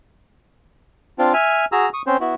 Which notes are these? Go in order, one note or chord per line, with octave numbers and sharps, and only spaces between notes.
C4 D4 F4
E5 G#5 F6
F#4 G#4 A#5 E6
C#6 D#6
C4 C#4 C5
B3 E4 F#4